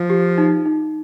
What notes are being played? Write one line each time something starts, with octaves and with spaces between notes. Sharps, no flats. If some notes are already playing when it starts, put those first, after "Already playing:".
Already playing: F3
G4
D#4
D#4